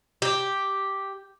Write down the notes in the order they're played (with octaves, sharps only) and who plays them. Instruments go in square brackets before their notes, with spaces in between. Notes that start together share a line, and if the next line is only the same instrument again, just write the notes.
[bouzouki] G4